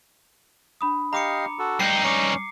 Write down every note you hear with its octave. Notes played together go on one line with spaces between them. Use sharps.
D4 B5 D#6
G4 D#5 F5 A#5 D6 C#7
F#4 A4
G2 D#4 G5 C7
C#4 D6 C#7